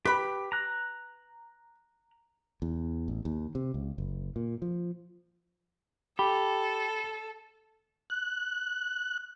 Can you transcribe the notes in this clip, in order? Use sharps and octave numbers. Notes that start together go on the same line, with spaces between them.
G4 B4 B5
A#5 F#6
E2
A1
D#2
C3
C#2
F#1
A#2
F3
G4 A4 B5
F#6